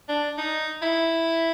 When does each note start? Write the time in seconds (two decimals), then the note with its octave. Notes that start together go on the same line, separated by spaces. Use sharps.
0.09 D4
0.38 D#4
0.82 E4